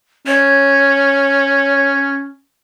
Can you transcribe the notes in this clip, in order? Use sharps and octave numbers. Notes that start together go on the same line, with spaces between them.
C#4 C#5